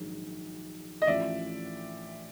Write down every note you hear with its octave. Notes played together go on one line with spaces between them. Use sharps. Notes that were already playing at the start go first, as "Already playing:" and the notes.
Already playing: A#1 G#2 D#3 F#3
D#5
A1 A2 F3 D5 E5